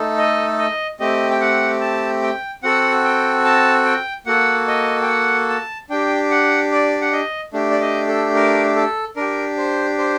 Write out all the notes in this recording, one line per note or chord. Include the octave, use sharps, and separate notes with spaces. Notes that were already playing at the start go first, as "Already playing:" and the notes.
Already playing: A3 D#4 A4
D#5
D#5
A3 C4 G4 D#5
G5
F#5
A5
G5
C4 F#4 A4 F#5
G5
A5
G5
A#3 F#4 A4 F#5
D#5
G5
F#5
A5
D4 G4 G5
F#5
D5
F#5
D#5
A3 D4 G4
D5
D#5
A4
A#4
A4
D4 G4 A#4
C5
C5